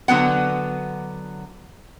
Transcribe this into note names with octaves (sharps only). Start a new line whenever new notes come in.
D3 F#3 B3 F#5